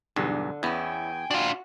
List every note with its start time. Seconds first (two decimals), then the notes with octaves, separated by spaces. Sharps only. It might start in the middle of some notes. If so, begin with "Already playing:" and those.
0.16 B1 E2 G2 D3
0.63 E2 B3 C#4 E4 G5 G#5
1.31 D4 F4 F#4